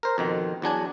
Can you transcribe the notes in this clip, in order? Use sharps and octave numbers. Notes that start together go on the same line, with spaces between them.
A#4 C5
F2 B2 D#3
E2 F#3 D4 G#5